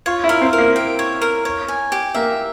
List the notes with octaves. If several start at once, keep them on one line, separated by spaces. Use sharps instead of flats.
F4 C#5
E4
A#4
C4
A#4
A#3
G5
C#5
A#4
C#5
G#5
G4
A#3 E5